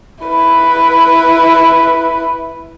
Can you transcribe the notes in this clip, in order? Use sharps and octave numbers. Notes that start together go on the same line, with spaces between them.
E4 B4